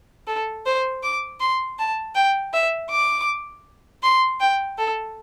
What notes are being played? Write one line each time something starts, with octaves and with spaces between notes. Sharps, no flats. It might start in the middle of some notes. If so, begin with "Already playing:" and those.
A4
C5
D6
C6
A5
G5
E5
D6
C6
G5
A4